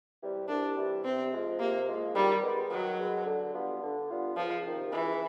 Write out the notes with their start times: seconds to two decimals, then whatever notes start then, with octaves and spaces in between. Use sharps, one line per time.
0.21 C3 E3 G3
0.48 C2 D4
0.77 C3 E3 G3
1.04 C3 C4
1.32 F3 G#3 C4 F4
1.60 C3 A#3
1.87 F3 G#3 C4 F4
2.15 D#3 G3
2.42 G#3 B3
2.70 D#3 F#3
2.98 G#3 B3
3.25 D3
3.53 G3 B3 D4 F4
3.81 D3
4.09 G3 B3 D4 F4
4.36 C#2 F3
4.65 C3 D#3
4.92 C#2 E3